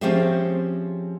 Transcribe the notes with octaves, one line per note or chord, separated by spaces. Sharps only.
F3 C4 C#4 G4 G#4 E5